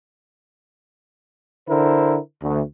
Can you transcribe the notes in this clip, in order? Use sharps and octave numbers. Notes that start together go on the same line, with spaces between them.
D3 E4 A#4 C5
D2